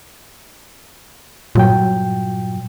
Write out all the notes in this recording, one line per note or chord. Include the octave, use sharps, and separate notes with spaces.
G2 A#2 F#3 G5